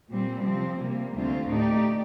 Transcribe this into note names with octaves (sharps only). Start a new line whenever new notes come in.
A#2 G3 C4
C3 F3 C4
C3 G3 A#3
D2 D3 A3 C4 F4
A2 A3 D#4 G4 D5